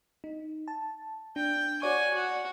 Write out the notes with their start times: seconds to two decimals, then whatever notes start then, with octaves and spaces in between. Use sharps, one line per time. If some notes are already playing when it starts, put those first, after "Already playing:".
0.24 D#4
0.68 A5
1.36 D4 G5
1.82 F#4 C#5 D5 G#5 C#6
2.14 F#4